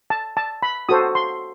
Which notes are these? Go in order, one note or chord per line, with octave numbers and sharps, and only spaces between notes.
A5
A5
B5
F#4 A4 C5 D#6
C6